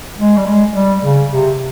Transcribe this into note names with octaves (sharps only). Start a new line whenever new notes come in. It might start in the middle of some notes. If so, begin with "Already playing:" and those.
G#3
G3
G#3
G3
C#3
C3